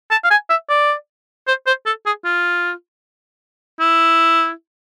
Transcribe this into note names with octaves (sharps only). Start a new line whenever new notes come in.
A5
F5
G#5
E5
D5
C5
C5
A4
G#4
F4
E4